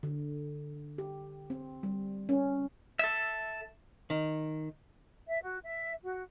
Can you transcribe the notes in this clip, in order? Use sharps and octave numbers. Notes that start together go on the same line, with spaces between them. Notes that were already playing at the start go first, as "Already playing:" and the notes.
D3
G4
C4
G3
C#4
A4 E5
D#3
E5
F#4
E5
F#4